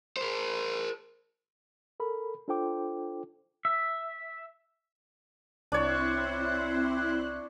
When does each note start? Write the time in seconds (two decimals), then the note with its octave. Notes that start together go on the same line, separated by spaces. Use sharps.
0.17 A#4 C5
2.00 A4 A#4 B5
2.48 D4 F4 A4 C5 G5 D6
3.65 E5
5.72 C2 C4 D4 E4 C5 C#5 F#6